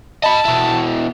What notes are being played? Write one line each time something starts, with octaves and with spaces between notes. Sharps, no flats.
D#5 A5 B5
B2 E4